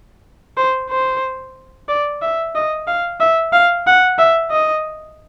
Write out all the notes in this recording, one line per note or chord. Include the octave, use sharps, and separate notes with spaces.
C5
C5
D5
E5
D#5
F5
E5
F5
F#5
E5
D#5